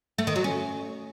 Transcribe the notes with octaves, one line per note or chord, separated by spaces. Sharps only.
A3
D#3
F#3
C#4